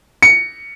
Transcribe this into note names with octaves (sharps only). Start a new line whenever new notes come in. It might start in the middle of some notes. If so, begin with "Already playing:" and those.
C#7